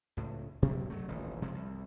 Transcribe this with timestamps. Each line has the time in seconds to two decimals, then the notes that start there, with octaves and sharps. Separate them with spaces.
0.17 C#2 A2
0.62 B2 F#3 G3 A#3
0.90 F#3 A3
1.08 D#1 A1
1.42 F#1 C3 F3 G#3
1.54 C2